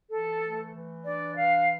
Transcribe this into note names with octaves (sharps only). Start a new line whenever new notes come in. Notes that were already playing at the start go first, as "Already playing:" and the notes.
E3 A4
A3
E3
D4 D5
E3 F5